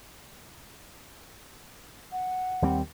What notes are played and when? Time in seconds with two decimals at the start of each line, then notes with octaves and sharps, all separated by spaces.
2.12 F#5
2.62 D#2 G3 C4